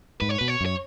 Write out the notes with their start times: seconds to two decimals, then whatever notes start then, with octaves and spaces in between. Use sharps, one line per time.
0.21 G#2 B4
0.29 C#5
0.38 B2 B4
0.48 C#5
0.61 F#2
0.66 C#5